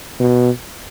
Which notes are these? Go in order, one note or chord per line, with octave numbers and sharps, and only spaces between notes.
B2